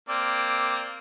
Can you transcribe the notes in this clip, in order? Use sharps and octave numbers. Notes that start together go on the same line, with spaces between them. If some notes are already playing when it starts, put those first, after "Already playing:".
A#3 C4 D5